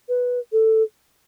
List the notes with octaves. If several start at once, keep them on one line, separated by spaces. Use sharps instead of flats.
B4
A4